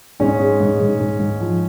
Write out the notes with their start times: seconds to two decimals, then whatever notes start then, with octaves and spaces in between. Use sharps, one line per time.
0.20 G#2 C#4
0.40 G#3
0.61 G#2
0.80 G#2
1.00 G#2
1.20 G#2
1.40 F3